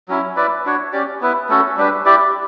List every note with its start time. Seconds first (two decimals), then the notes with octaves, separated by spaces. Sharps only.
0.08 F#3 C#4 E4
0.37 E4 B4 D5
0.65 D4 F#4 C#5
0.93 C#4 G4 D5
1.21 B3 E4 B4
1.49 A3 C#4 F#4 A4
1.77 G3 D4 G4 B4
2.06 E4 G4 D5